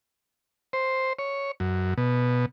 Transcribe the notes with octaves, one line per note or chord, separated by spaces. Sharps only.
C5
C#5
F#2
B2